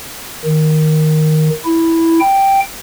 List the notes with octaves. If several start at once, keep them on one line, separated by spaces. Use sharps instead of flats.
D#3
E4
G5